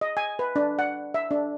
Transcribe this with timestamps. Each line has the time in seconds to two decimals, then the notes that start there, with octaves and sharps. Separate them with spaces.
0.01 D#5
0.17 G#5
0.39 B4
0.56 D4
0.79 F#5
1.14 E5
1.31 D4